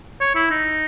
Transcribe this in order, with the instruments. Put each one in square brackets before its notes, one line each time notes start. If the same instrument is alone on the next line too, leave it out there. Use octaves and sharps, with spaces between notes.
[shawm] C#5
E4
D#4